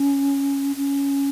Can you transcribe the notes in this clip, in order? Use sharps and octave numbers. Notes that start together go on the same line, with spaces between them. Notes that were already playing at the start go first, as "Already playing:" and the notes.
Already playing: C#4
C#4